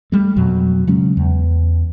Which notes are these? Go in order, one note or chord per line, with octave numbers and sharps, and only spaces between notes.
G3 A3
F2 B2 F#3
C#3 F#3 G#3 C#4
E2